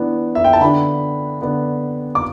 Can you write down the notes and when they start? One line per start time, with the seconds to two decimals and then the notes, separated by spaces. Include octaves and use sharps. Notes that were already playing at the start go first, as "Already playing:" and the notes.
Already playing: E3 B3 D4
0.35 E5
0.44 G5
0.53 A5
0.61 D3 B3 D4 B5
1.41 D3 B3 D4
2.15 D6